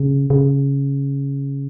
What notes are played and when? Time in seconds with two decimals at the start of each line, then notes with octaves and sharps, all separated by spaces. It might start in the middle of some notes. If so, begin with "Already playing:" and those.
Already playing: C#3
0.30 C#3